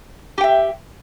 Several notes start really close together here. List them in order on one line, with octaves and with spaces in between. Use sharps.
G4 G5 E5